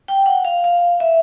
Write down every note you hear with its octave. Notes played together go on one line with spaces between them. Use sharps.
G5
F#5
F5
F5
E5